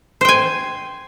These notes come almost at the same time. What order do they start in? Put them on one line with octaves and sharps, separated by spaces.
C5 G5 G#5